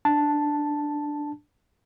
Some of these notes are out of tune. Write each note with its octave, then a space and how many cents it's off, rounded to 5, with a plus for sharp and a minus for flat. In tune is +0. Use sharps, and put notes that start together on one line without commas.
D4 +5 A5 +0